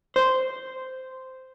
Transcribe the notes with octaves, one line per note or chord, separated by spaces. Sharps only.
C5